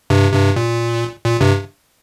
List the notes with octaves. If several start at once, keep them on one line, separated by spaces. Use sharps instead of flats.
G2 C3
G2 C3
A#2
A#2
G2 C3